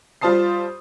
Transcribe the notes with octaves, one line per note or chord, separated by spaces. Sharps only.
G3 F4 C5 A5 D#6 C7